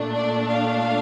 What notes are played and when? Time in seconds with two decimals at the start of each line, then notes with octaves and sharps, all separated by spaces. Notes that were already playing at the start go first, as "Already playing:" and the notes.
Already playing: A#2 A3 D4
0.14 D5
0.48 F5